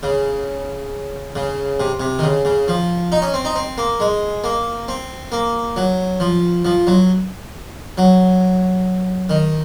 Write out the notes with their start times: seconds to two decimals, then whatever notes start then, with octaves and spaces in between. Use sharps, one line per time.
0.03 C#3
1.36 C#3
1.80 C3
2.00 C3
2.19 D#3
2.23 C#3
2.45 C#3
2.68 F3
3.12 D#4
3.22 C#4
3.34 C4
3.45 D#4
3.56 C4
3.78 A#3
4.00 G#3
4.44 A#3
4.88 C4
5.32 A#3
5.76 F#3
6.20 F3
6.65 F3
6.87 F#3
7.98 F#3
9.30 D#3